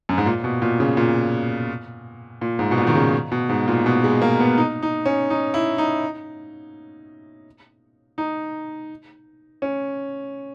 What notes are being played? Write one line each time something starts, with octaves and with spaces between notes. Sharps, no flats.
F#2
G#2
A#2
B2
A#2
C#3
A#2
A#2
G#2
B2
A#2
D#3
C#3
B2
G#2
A#2
B2
G#3
A#3
B3
D#4
D#4
C#4
D#4
E4
D#4
D#4
C#4